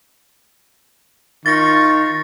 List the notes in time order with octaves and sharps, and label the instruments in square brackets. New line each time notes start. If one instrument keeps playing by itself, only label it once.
[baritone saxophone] D#3 [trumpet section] F4 C#6 [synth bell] A6 A#6